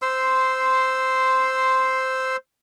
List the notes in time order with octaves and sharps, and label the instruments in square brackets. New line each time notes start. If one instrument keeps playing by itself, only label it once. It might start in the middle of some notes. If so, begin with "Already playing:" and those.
[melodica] C5 C6 E6